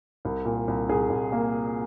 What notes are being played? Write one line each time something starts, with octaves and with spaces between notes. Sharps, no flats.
C2
A#2
C2
C2 G#4
C2
A#3